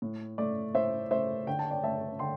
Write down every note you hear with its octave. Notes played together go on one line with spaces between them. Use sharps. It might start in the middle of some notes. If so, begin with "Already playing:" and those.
A2
A3 D5
A2 C5 E5
A3 C5 E5
D3 G5
A5
D5 G5
A3 E5 A5
D3 G5 C6